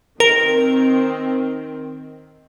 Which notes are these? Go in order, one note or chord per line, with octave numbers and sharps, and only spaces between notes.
D#3 C4 A#4